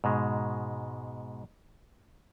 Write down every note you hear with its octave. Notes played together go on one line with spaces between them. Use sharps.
G#2 B2 G#3